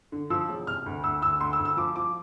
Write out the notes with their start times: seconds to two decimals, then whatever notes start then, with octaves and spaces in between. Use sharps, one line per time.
0.12 D3
0.30 F3 E6
0.49 E1
0.67 C3 F6
0.86 D2
1.04 D2 E6
1.22 D2 E6
1.41 D2 C6
1.53 E6
1.59 D2
1.65 E6
1.77 F3 D6
1.96 F3 D6